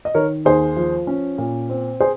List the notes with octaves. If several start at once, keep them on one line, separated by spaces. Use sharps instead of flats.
D#5
D#3 A#4 C#5
D#2 G#4 C5
F3
C#4
A#2
C4
G#4 C5